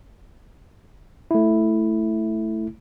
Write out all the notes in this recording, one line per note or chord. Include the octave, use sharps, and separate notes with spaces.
A3 E4